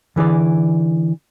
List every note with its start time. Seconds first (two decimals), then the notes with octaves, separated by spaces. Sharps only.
0.16 D3 E3 G#4 D5